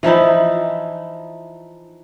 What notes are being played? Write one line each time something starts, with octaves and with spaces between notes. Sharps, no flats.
E3 F3 D#4 E4